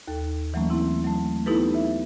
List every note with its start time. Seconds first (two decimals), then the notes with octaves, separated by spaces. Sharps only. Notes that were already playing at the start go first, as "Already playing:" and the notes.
0.08 D#2 A4
0.54 E3 F#3 A3 A#3 C#4
0.70 C4 E4
1.04 F#3 A3
1.46 B3 D#4 E4 G4 A4 B4
1.75 E5